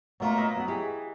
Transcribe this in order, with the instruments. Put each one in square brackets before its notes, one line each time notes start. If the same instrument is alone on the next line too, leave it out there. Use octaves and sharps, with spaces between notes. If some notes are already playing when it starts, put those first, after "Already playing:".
[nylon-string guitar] B2 A3 D#4 [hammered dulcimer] F#3 A#3 F4
[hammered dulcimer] B4 D#5 E5
[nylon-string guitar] F#3 B3 F#5
[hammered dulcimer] E3 [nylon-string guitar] G4 G#4